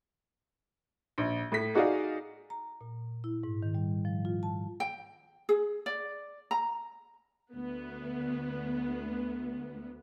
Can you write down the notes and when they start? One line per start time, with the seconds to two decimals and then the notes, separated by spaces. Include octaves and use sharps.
1.18 A#1
1.52 A2 B6
1.74 D#4 F#4 G#4 D5 D#5 F5
2.50 A#5
2.81 A#2
3.24 E4
3.43 G#2
3.63 D#3
3.75 G3
4.05 F3
4.25 F4
4.43 A5
4.80 G5
5.49 G#4
5.86 D5
6.51 A#5
7.54 D2 B3